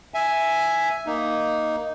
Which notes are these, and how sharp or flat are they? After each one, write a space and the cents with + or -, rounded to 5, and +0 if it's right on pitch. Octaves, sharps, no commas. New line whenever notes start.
E5 +0 G#5 +0
A#3 +0 D#4 +0